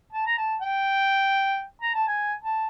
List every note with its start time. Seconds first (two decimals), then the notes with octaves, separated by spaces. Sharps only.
0.13 A5
0.27 A#5
0.38 A5
0.62 G5
1.82 A#5
1.94 A5
2.07 G#5
2.44 A5